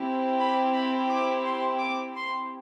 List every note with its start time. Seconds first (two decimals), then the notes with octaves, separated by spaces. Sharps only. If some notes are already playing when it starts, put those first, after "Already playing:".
Already playing: C4 E4 G4
0.39 B5
0.74 B5
1.10 D6
1.45 C6
1.80 D6
2.16 C6